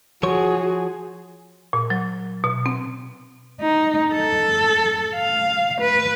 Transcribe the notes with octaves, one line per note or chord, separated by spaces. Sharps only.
F3 F#4 G#4 C#5
A#2
F#3
B2
C4
D#4
A4
F5
B4